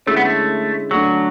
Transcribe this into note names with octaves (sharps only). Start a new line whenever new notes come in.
D3 G#3 A3 C#4 E4
B3
A3
D3 F#3 A3 D4